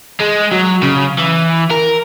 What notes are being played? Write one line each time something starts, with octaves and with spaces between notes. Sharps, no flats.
G#3
F#3
C#3
E3
A#4